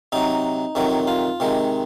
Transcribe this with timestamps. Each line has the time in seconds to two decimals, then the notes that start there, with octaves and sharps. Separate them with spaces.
0.12 C3 F#3 D#4
0.75 F2 C3 D#3 F#3
1.07 F4
1.40 C3 D#3 G#3